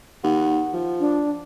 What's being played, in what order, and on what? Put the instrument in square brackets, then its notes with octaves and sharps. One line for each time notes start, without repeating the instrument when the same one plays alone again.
[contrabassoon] D#2 [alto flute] F#5
[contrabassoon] F3
[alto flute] D4